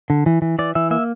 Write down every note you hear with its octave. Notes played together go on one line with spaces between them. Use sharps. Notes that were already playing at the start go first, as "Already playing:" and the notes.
D3
E3
E3
E3 D5
E3 E5
A#3 E5